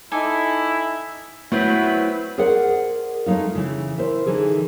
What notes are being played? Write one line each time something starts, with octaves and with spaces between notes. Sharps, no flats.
D#4 E4 A4 G#5 D6
F#3 A3 B3 C4 E4 B4 C5
G#4 A#4 C5 D5 F#5
G#3 A3 C4 D#4 F4
C#3 E3
E4 A#4 C5
D3 E3 D#4 G#4